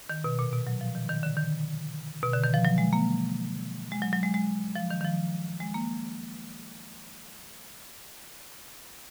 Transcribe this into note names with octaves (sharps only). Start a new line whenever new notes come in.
D#3
B2
A#2
B2
F#3
F3
D#3
D#3
D3
D#3
B2
D3
D#3
F3
F#3
G#3
A#3
G#3
F#3
F#3
G#3
G#3
F3
D#3
D#3
F3
G#3
A#3